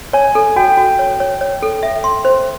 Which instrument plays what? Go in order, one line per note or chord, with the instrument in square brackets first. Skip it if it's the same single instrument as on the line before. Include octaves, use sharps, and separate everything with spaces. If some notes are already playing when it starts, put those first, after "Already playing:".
[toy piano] C#5 [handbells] G#5
[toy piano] A4
[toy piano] F#4 [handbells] G5
[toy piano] F#4
C#5
C#5
C#5
A4
E5
C6
C5